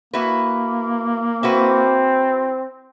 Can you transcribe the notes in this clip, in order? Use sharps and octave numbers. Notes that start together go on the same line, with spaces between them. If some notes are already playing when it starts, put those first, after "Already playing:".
A#3 E4 F#4 B4
C4 E4 F#4 B4